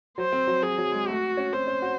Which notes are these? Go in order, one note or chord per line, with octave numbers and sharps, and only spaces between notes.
F#3 C5
C4
F#3
F#3 G#4
F#3
G#3
A3 F#4
C#4
C4 C5
C#4
F#4